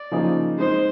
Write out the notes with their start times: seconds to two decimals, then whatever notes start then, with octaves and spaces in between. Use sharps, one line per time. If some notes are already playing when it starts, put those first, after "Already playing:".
Already playing: D5
0.11 C#3 F3 A#3 D#4 G#4
0.58 G#3 C4 D#4 C5